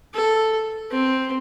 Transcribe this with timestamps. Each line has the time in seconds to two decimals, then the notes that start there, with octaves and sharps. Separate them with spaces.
0.14 A4
0.91 C4